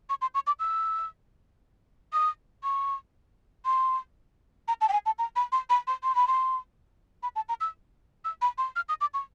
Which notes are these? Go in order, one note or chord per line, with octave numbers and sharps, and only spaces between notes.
C#6
C6
C#6
D6
E6
D#6
C#6
C6
A#5
A5
G5
G#5
A5
A#5
B5
C6
B5
C6
C6
B5
C6
B5
A5
A#5
E6
E6
B5
C6
F6
D#6
D6
C#6